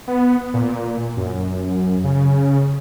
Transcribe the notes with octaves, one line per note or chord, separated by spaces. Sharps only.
B3
A#2
F#2
C#3